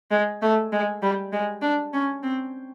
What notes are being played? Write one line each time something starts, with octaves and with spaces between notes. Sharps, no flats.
G#3
A3
G#3
G3
G#3
D4
C#4
C4